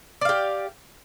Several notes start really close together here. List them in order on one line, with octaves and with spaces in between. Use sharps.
D5 F5 G4